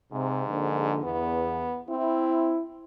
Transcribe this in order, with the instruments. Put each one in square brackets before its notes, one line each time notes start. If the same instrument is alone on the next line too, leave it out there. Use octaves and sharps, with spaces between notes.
[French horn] G#2 [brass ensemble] C3
[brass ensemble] A#1 D3
[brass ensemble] E2 [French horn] B3
[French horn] C4 [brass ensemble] E4